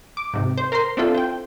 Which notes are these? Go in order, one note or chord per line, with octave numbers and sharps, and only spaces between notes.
D6
G#2 C3
C5
A#4 C5 A#5 C6
C4 D4 E4 F4 A4
C5 G5